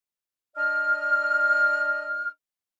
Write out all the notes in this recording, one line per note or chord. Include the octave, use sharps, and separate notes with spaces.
D4 D5 D#5 F6